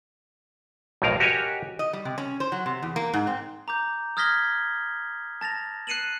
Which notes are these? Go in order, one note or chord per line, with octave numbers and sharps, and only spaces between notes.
B1 F2 A2 D#4 A#4 F5
F#4 G4 A#4 C#5 D#5 G#5
D#5
G3
C3
C#4
C5
F#3
C3
E2
A#3
G#2
C4
A#5 D6 G6
D#6 F6 G#6 A#6 B6 G7
A5 A6 A#6 F7
F#6 C7 C#7 D#7 E7 F#7